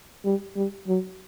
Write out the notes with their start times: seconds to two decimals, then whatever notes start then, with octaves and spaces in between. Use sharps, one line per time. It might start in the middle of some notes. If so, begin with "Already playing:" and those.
0.25 G3
0.56 G3
0.88 F#3